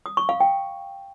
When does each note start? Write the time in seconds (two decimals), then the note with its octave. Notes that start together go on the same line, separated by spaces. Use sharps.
0.06 D#6
0.17 C#6
0.29 F5
0.40 G5